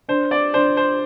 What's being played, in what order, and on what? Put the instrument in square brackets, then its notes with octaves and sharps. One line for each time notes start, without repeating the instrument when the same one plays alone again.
[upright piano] D4 [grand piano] C5
[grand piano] D5
[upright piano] D4 [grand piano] C5
[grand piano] C5